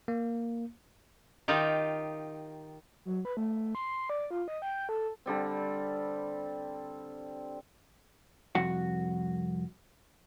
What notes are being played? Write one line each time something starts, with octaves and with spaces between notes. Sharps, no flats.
A#3
D#3 D#4 F4 G4
F#3
B4
A3
C6
D5
F4
D#5
G5
A4
D3 G3 C4
C2 F2 F#4 F#5